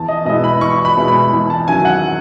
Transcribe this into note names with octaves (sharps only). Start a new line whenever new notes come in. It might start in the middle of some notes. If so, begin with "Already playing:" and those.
Already playing: E2 A5
D#5
B2 G#3 B3 E4 D#5
B5
E2 C#6
B5
B2 G#3 B3 E4
B5
E2
A5
D#3 F#3 C#4 E4 G#5
F#5